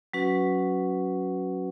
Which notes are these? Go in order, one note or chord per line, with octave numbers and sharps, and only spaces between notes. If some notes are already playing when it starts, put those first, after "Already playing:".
F#3 C#4 F#4 B4